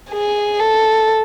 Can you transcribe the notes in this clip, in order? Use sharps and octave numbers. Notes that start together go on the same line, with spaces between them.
G#4
A4